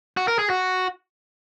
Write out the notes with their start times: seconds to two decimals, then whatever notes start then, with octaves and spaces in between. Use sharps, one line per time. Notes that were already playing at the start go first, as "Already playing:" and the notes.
0.17 F#4
0.28 A#4
0.39 G#4
0.50 F#4